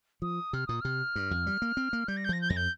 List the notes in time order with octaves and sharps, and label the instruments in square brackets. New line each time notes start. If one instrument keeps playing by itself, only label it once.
[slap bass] F3 [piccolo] D#6
[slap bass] C3 [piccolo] F6
[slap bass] A#2 [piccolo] D#6
[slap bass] C3 [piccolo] F6
[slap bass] G2
F2
G3
A#3
C4
A#3
[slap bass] G3 [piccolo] G6
[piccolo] A#6
G6
[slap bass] F3 [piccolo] A#6
[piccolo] G6
[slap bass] F2 [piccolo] A#6
[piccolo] G6